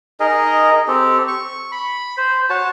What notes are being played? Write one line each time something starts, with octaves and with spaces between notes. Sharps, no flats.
D#4 G#4 A#4 D#5
C4 G4 A4
C#6
B5
C5
F#4 C#5 A5